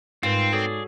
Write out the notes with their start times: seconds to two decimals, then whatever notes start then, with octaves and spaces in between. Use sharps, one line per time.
0.23 G#2 C4 D#4 F4 A#4 B4
0.53 F#4 G#4 A4 C#5 D5